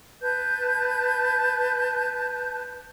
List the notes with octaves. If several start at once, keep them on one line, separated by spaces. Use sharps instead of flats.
B4 A5 G6